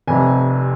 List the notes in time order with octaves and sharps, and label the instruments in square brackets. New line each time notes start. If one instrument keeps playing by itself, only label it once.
[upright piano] F1 F2 C3 G#5